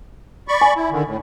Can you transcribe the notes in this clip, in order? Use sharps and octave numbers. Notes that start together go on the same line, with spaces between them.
D5 B5 C#6
G#5
E4
D3 D#3
A2